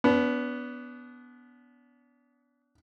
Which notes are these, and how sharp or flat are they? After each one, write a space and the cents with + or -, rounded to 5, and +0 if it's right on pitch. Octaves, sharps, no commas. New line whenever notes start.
B3 +0 D4 -40